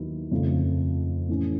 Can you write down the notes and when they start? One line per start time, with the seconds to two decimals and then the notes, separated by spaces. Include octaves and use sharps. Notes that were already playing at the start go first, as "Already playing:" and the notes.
Already playing: D#2 D#3 F#3 B3 E4
0.31 F2 C#3 F3 A3
1.29 A2 E3 A3 C#4